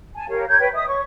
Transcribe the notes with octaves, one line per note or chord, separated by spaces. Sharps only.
G#5 A5
G4 A#4 C#5 F5
A#4 C#5 G6 G#6
B4 C#5 G5
D#5 E5 D#6
C#5 C#6